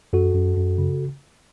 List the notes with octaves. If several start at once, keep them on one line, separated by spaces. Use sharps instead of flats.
F#2 F#4 A4
F#2
F#2
C#3